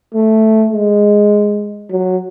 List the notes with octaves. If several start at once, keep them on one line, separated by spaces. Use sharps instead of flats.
A3
G#3
F#3